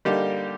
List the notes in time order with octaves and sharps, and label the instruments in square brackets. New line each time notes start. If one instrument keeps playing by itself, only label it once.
[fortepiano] D3 G3 A#3 D#4 G4